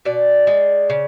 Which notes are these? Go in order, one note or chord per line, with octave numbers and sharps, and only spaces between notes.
B2 D5
G#3
C#3